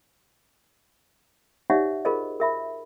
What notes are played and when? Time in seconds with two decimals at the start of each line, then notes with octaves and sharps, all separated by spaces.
1.70 D#4 G4 C#5 D5 E5 F#5
2.05 F4 G#4 A#4 C5 D#5
2.40 A#4 E5 B5